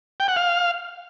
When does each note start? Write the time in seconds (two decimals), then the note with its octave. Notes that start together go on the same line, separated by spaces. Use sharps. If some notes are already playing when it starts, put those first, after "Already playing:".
0.20 G5
0.28 F#5
0.36 F5